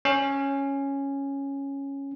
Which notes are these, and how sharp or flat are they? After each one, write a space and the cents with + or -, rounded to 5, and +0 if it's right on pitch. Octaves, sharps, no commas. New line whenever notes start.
C#4 -5